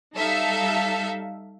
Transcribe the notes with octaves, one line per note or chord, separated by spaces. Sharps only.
G3 D#4 A4 E5 F5